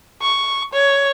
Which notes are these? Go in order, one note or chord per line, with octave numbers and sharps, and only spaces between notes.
C#6
C#5